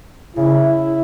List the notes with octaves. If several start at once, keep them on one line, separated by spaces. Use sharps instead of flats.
C#3 E4